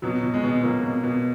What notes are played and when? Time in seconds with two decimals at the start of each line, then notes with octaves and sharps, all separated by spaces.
0.02 B2 F#3
0.23 B2
0.34 G#3
0.43 B2
0.63 B2 F#3 A#3
0.83 B2
1.04 B2